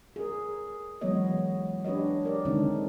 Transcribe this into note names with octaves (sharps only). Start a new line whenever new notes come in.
G#4 A#4
E3 F#3 G#3 B3 C#5 D#5
D4 G4 B4 C#5 D#5
G4 A#4 C#5 D5
D3 D#3 G#3 C4 D4 D#4